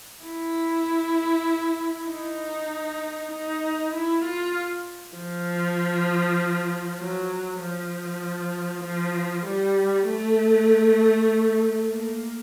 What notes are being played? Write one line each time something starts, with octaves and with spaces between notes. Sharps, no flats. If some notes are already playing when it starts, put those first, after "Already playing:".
E4
D#4
D#4
E4
F4
F3
F#3
F3
F3
G3
A3
A#3